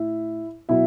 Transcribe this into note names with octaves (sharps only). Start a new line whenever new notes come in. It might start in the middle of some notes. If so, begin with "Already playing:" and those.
Already playing: A2 E4 E5
B2 F#3 E4 E5